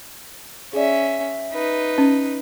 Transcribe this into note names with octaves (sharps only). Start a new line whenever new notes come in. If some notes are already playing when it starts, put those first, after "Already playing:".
C#4 G#4 D5 E5
D#4 B4
C#4